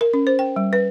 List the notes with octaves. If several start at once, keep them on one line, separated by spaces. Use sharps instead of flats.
A#4
C#4
C5
G5
G3
B4